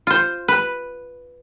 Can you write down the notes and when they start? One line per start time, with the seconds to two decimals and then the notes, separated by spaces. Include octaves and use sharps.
0.07 F4 C5
0.48 B4